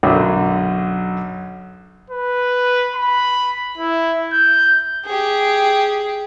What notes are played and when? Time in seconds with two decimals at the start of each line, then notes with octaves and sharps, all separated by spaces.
0.03 B1 F#2 D3 F#3
2.10 B4
2.96 B5
3.77 E4
4.33 G6
5.05 G4 G#4